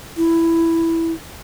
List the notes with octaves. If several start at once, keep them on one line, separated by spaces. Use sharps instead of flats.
E4